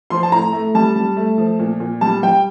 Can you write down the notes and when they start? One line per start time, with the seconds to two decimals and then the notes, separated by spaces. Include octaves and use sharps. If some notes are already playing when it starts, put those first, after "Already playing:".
0.10 F3 C6
0.23 A5
0.32 A2 A#5
0.53 A3
0.75 G3 A5
0.96 G3
1.17 A3
1.38 F3
1.59 A#2
1.80 A#2
2.01 G3 A5
2.23 G3 G5